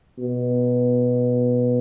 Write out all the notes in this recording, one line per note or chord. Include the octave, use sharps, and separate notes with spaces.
B2